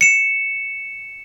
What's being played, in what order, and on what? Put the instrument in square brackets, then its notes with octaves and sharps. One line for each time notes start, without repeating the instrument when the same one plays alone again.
[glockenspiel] C#7 E7